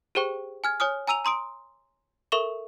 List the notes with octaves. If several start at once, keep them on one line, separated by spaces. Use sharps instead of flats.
G4 G#4 C5 G5 C#6
G#5 F6 G#6
C#5 G#5 D#6 F6
G#5 A#5 E6 D#7 F7
A#5 C6 D#6 D7
A4 A#4 E5 C#6 E7 G7